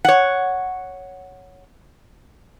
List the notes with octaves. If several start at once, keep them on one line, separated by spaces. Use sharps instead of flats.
C#5 F#5